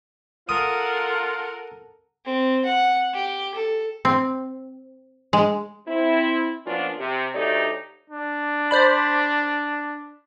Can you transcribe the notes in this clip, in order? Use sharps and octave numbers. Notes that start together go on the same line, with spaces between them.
F4 A4 A#4 F#5 D#6
C4
F#5
G4
A4
C4
G#3
C4 E4
F3 A#3 B3 C#4 D4 F4
C3
D2 A3 D#4 G4 C#5 D5
D4
C5 D5 B5